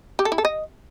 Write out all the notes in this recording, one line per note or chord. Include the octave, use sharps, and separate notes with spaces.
G4
A4
E4
A4
D#5